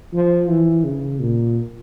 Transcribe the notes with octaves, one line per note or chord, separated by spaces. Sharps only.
F3
E3
C#3
A#2